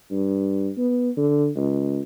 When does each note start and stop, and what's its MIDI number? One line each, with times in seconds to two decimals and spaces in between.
0.11 0.70 43
0.78 1.10 59
1.17 1.50 50
1.56 2.00 37